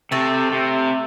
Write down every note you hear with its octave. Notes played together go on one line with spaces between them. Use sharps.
C3 A3 A4
C3